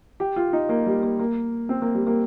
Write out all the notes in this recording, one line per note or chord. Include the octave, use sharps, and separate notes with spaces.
G4
F4
D#4
A#3
G3
A#3
A#3
C4
A#3
G3
A#3